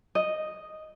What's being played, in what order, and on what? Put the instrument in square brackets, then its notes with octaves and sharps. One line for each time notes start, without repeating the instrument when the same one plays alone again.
[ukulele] D#5